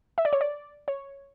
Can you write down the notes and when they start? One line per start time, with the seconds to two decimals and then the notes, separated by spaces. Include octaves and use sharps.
0.18 E5
0.25 D5
0.33 C#5
0.41 D5
0.88 C#5